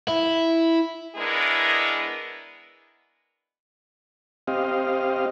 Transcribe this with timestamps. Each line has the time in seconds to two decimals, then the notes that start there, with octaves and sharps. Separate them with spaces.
0.08 E4
1.16 G#3 B3 D4 E4 G#4 A#4
4.48 C4 G4 D#5 F5